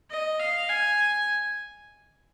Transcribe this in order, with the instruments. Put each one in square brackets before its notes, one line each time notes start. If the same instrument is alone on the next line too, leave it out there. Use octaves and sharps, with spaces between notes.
[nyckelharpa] D#5
F5
G#5